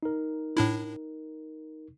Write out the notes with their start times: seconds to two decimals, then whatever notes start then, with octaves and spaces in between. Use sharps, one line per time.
0.03 D#4 A#4
0.57 A2 D4 E4